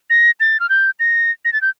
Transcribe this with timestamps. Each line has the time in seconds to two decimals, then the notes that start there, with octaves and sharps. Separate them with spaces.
0.10 A#6
0.40 A6
0.60 F6
0.69 G6
1.00 A#6
1.45 A#6
1.53 A6
1.62 G6